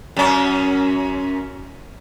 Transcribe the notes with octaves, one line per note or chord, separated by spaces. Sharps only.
F#2 C#4